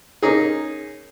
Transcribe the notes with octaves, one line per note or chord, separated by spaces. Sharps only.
A#3 C#4 D#4 G#4